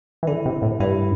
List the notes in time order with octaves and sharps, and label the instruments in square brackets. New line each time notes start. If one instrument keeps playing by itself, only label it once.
[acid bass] E3
[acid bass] D3 [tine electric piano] E4
[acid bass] C3
A2
[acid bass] G2 [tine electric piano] E4